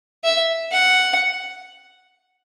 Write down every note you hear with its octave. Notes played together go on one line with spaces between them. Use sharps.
E5
F#5